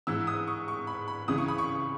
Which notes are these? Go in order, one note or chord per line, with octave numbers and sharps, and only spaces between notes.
G#2 E3 E6
D#6
C#6
C#6
B5
B5
C#2 C#3 E3 D#6
C#6
B5
C#6